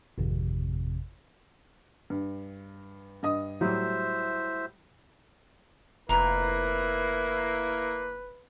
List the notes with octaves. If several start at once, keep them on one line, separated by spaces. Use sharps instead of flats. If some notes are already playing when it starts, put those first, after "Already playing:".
G#1 F2 C3
G2
G2 D#5 D#6
A2 F#3 G3 C5 E5
F1 A#3 E4 B4 A#5